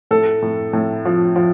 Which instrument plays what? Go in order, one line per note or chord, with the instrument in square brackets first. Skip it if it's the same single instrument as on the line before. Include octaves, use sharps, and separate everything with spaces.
[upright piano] A2 A4
A2
A2
F3
F3